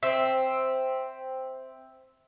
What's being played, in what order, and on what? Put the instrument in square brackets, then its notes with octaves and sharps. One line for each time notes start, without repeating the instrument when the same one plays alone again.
[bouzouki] C4 [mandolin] E5